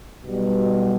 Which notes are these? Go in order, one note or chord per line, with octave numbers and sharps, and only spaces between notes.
B1 B2 G3